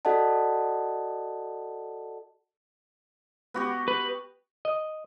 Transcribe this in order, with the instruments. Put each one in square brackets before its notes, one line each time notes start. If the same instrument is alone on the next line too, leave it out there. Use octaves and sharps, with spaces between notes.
[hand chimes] F#4 A4 D5 D#5 F#5 A5
[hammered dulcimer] B3 F#4 G4
[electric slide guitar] B4
[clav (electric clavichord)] D#5